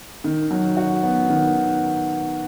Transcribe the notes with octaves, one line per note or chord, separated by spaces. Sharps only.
D#3
F#3
F#4
B3
D#3